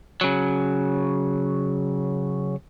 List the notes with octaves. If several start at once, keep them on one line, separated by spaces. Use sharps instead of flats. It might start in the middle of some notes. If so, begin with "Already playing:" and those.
C#3 F#3